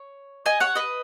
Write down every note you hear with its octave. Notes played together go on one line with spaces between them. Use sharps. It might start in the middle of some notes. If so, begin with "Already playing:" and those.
Already playing: C#5
D#5 G#5
C#5 F#5
B4 D#5